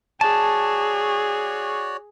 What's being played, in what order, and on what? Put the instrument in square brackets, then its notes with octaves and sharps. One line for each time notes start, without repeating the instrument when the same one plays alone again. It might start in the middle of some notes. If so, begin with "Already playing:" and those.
[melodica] F#4 C#5 D5 [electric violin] G#4 [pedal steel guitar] A5